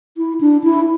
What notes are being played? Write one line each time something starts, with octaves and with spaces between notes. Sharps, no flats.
E4
D4
E4